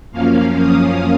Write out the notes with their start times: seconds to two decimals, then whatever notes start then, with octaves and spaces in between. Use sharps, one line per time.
0.11 F#2 F3 A#3 C#4 F5
0.56 D#6